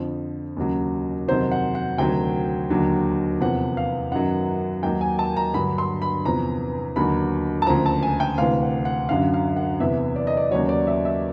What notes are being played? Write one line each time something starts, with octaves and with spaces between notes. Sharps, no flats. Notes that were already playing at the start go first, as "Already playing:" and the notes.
Already playing: F2 D3 F3
D#2 C#3 F#3
F2 C3 D#3 F#3 C5
F#5
F#5
D2 C3 D#3 F#3 G5
D#2 D3 F#3
E2 C3 F3 F#5
F5
F#2 D#3 F#3 F#5
D#2 D#3 F#3 G5
G#5
A5
A#5
G2 D3 F#3 B5
C6
B5
E2 C3 F3 A#5
D#2 D3 F#3 B5
A5
D2 C#3 F3 A#5
A5
G#5
G5
D2 C3 E3 F5
F#5
F#5
F#2 D3 F#3 F5
F5
F#5
E2 C3 E3 E5
D5
D#5
D5
D#2 C#3 F#3 C#5
D5
E5
E5